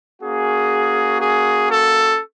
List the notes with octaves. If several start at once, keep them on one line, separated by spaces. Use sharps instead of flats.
A#3 C#4 F#4 G#4
G#4
A4